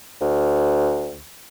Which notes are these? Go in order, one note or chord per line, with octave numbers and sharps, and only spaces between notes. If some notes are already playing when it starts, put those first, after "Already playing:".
D2